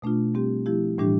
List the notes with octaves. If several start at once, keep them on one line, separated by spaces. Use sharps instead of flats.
B2 A3 D4 F4
G3 C4 G4
F3 A3 E4 G4
A2 E3 G3 D4 G4